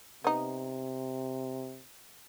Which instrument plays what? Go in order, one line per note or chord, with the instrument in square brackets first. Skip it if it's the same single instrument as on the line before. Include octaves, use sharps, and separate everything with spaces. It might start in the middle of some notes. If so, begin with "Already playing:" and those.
[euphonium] C3 [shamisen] B3 D#4